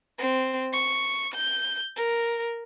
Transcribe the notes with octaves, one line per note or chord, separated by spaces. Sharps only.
C4
C#6
G6
A#4